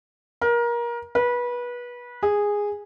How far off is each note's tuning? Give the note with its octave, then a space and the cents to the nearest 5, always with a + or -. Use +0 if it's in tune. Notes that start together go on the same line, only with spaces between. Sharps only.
A#4 +25
B4 -25
G#4 -10